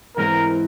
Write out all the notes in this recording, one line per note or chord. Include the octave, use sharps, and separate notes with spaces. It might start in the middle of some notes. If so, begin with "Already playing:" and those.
G#2 E3 G#3 C4 A#4